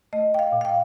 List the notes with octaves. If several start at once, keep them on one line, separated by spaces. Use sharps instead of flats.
A3 D#5
G5
F5
A#2
F5
G5